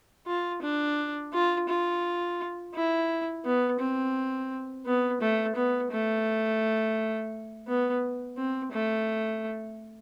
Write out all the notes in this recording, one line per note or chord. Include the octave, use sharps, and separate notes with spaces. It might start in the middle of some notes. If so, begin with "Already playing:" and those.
F4
D4
F4
F4
E4
B3
C4
B3
A3
B3
A3
B3
C4
A3